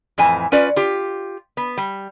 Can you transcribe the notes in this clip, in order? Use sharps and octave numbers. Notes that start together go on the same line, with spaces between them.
F2 A2 E3 G#5
C#4 F4 B4 D5
F4 G4
B3
G3